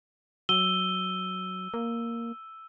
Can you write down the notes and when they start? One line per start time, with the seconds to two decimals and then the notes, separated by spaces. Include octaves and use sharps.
0.49 F#3 E6 D#7 G7
1.74 A#3